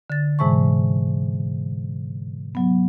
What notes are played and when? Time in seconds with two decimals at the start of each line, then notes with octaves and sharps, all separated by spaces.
0.10 D3 A6
0.39 G#2 C3 E3 G#3 A5 C#6
2.55 F#3 B3